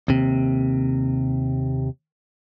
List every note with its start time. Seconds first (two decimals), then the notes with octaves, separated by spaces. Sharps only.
0.08 D#2 C3